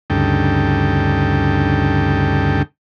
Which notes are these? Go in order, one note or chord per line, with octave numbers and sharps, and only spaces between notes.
D2 G2 C#3 D#4 A4 G5